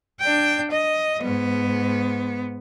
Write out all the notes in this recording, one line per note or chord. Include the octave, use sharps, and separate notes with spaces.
D4 G5
D#5
G#2 B3